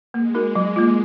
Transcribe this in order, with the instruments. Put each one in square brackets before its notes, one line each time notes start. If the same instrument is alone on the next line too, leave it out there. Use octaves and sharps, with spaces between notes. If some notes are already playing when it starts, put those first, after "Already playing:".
[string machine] G#3 [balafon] A#3
[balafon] D#4 F#4 A#4
[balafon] F#3 [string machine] G#3
[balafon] A#3 F4